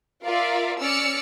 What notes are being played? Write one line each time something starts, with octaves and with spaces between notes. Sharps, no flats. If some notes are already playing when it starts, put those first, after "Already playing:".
F4 A#4 D5 E5 F5
C#4 D5 E6 F6 C#7